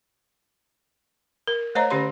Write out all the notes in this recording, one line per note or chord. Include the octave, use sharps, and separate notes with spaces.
A#4
A3 C5 C#5 D#5 A#5
D3 C#4 G4 B5 C6